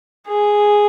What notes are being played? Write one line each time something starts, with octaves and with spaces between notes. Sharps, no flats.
G#4